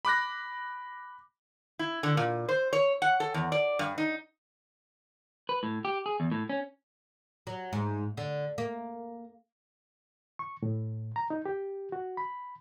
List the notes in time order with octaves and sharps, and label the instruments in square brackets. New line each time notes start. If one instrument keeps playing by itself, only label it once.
[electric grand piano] B5 D6 F#6 A#6
[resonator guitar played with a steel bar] E4
D3
A#2
C5
C#5
F#5
A4
E2
D5
G2
D#4
[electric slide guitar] B4
A2
G4
G#4
E2
A2
C#4
[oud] F#3
G#2
D3
A#3
[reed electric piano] C#6
A2
A#5
D#4
G4
F#4
B5